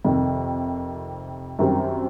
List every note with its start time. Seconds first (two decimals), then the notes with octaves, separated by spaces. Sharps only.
0.04 F2 C3 D#3
1.59 F#2 D#3 G3 C4